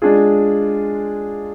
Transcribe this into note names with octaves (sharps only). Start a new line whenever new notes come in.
G#3 D4 F4 G#4